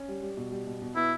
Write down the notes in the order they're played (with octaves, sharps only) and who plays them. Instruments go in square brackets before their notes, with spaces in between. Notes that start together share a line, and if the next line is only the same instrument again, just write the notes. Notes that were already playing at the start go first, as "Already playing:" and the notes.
Already playing: [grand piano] C#4
G3
G3
B2
G3
B2
B2
[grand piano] B3 [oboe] E4